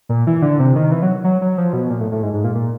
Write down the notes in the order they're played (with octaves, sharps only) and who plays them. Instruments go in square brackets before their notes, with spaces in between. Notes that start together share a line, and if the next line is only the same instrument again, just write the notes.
[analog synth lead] A#2
E3
D3
C3
D#3
E3
F#3
F#3
F#3
F3
B2
A#2
A2
A2
G#2
G#2
A#2
A#2